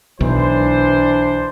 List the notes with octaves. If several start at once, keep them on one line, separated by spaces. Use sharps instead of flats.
B1 E3 D4 C5